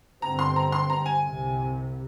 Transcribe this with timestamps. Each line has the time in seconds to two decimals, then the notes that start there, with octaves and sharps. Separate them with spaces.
0.22 G1 G2 D3 G3 C4 A#5
0.39 C6
0.56 A#5
0.72 C6
0.90 A#5
1.06 G#5
1.23 C2 C3